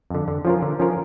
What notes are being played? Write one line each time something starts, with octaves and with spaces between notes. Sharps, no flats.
F2 D3
D3
F3 C#4 F4 A#4
D3
F3 C#4 F4 A#4